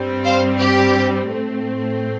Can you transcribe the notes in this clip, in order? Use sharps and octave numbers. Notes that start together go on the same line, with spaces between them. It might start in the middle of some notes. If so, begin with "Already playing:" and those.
Already playing: G2 G3 C4
C5 F5
G4
A2 A3 C4